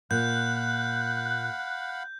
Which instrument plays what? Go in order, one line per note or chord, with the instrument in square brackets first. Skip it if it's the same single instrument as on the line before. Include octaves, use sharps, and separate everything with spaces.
[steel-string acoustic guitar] A#2 [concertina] F5 F#5 B5 [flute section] F#6 [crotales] G6